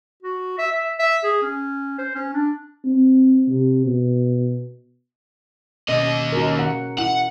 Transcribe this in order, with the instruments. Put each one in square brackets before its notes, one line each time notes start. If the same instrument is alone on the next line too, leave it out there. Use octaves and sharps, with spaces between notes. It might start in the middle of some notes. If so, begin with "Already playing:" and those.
[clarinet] F#4
E5
E5
E5
G#4
C#4
C5
C#4
D4
[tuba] C4
C3
B2
[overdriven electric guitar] D#2 D#5 [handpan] B2 C#4
[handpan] C#4 F#4 A#4
F#5
[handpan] E4 [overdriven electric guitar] F#5